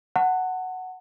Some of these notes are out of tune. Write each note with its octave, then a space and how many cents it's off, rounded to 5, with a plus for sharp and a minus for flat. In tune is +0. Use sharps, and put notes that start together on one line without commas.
F#5 +0 A5 +35